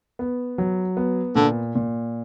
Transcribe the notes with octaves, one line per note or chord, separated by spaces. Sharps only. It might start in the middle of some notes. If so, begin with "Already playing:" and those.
B3
F#3
B3
A#2 D3
A#2